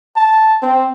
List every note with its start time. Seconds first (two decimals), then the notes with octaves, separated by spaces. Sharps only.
0.16 A5
0.62 C4